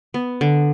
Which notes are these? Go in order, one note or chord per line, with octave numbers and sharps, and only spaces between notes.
B3
D3